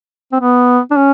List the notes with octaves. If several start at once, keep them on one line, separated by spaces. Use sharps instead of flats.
C4
B3
D4
C#4